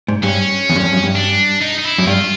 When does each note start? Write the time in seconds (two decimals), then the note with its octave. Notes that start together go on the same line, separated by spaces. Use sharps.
0.08 G#2
0.23 G2 C#4
0.70 E2
0.76 F#2
0.80 F2
0.93 F#2
1.03 G2
1.16 D4
1.61 D#4
1.78 D#4
1.84 E4
1.98 F#2
2.07 G2 F4